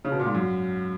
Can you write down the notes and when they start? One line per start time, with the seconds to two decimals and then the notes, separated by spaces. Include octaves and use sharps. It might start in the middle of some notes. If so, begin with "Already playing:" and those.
0.05 C#3
0.12 B2
0.19 A#2
0.26 G#2
0.35 F#2